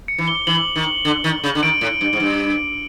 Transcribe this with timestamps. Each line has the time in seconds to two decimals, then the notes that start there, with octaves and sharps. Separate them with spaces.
0.08 C#7
0.18 E3
0.28 G7
0.47 E3 F#7
0.76 D#3
1.05 D3
1.24 D#3
1.44 C#3
1.55 D3
1.63 D#3 D7
1.81 A2
2.01 G2
2.13 G#2
2.20 G2